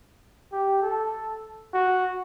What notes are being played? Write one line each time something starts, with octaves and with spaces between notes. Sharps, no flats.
G4
A4
F#4